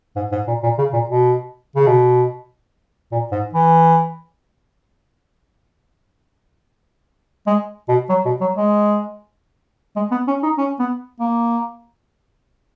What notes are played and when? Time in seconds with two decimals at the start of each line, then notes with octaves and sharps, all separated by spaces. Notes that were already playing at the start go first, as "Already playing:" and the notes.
0.16 G#2
0.32 G#2
0.48 A#2
0.63 A#2
0.78 C#3
0.93 A#2
1.09 B2
1.76 C#3
1.87 B2
3.12 A#2
3.32 G#2
3.53 E3
7.47 G#3
7.88 B2
8.09 F#3
8.25 B2
8.41 F#3
8.57 G#3
9.96 G#3
10.11 B3
10.28 C#4
10.43 D#4
10.58 C#4
10.79 B3
11.20 A#3